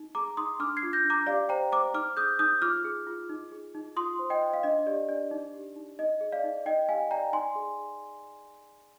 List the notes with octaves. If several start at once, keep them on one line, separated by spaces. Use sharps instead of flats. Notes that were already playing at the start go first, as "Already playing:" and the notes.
Already playing: D#4
G#4 A#5 D6
D#4 C6 D#6
D4 D6 F6
G#6 C7
F4
G6 A#6
D4
A#5 D6
G4 D5 F5
C5 G5 A#5
C5 A#5 D6
D#4 D6 F6
G#4 D#6 G6
D#4 D#6 G6
F4 D6 F6
G#4
F4
D#4
G#4
D#4
F4 C6 D#6
C5
D#5 G5
C5
F5
D4 D#5
G4 D5
D4 D5
D#4
G4
D#4
D#4 D#5
G#4
D5 F5
D#4
D#4 D#5 G5
G4 F5 G#5
D5 G5 A#5
D#4 G#5 C6
G#4